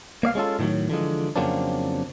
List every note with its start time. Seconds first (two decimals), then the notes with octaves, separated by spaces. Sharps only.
0.23 A#3 D5 F5
0.35 G#3 C#4 F4 A4
0.59 A2 D#3 E3 F#3
0.90 D3 E3 F3 G#3
1.36 F2 C#3 F#3 A#3 C4 D4